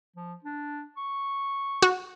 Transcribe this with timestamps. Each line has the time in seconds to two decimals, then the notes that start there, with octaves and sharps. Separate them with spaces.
0.16 F3
0.44 D4
0.97 C#6
1.82 F#4